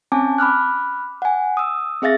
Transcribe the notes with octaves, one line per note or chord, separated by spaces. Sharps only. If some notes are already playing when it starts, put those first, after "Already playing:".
C4 C#4 G#5 A5 D6
B5 D6 F6 F#6
F#5 G#5
D#6 E6
C4 G#4 E5 F5 A6 A#6